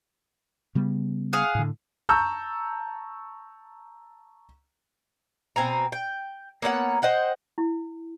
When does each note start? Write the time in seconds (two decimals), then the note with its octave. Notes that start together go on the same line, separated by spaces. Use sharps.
0.75 C#3 G3 B3
1.33 G#4 F5 F#5
1.55 A2 D3
2.09 A5 A#5 C#6 E6 G6
5.56 B2 C4 G#5 A#5
5.92 G5
6.62 A#3 B3 C#4 F#5
7.02 C5 D#5 F#5 G5
7.58 E4